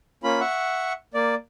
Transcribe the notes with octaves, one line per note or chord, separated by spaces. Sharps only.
A#3 C#4 F4 B5
E5 F#5 C#6
A#3 D5